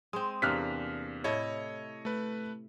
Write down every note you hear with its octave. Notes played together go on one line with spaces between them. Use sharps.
G#3 C4 D#6
E2 C3 A#3 D4 F6 F#6 B6
A2 E4 A4 C#5 D#5
A3 B4